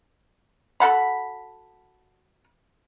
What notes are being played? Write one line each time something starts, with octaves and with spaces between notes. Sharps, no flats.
F#4 A4 F#5 B5